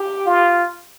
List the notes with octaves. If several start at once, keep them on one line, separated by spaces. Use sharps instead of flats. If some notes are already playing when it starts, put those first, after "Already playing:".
Already playing: G4
F4